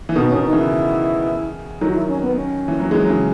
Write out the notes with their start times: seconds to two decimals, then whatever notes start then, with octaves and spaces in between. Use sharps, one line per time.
0.09 E3
0.16 B2 D#3 B3
0.30 B2 D#3 C#4
0.44 D#4
0.52 C#3 E3 E4
1.80 D#3 F#3 D#4
1.89 F#4
1.94 E4
2.08 C#4
2.22 B3
2.37 C#4
2.68 E3
2.80 F#3
2.91 E3 G#3
3.04 F#3
3.09 C#3 E3